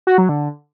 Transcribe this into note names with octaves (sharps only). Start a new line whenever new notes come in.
F#4
F#3
D3